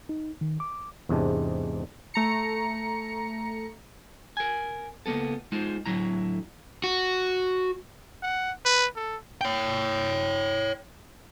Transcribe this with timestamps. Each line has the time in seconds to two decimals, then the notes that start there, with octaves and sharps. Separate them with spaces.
0.09 D#4
0.41 D#3
0.60 D6
1.09 E2 G#2 C3 G#3 D4
2.14 A3 A#5 C#7
4.37 A#4 G#5
5.06 C#2 A#3 B3 A4
5.52 G#3 D#4 F4 C5
5.86 A2 D3 F#3 E4 A#5
6.84 F#4
8.23 F#5
8.65 B4
8.96 A4
9.41 C#5 G5